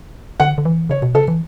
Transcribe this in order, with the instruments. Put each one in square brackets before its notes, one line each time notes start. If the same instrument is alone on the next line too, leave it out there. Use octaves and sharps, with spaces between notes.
[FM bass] D3 [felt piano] F#5
[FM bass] D3
E3
[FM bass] C#3 [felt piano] C#5
[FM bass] B2
[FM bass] C#3 [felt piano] A4
[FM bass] E3